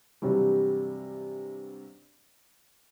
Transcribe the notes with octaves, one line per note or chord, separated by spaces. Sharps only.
G2 C3 E3 F#3 G3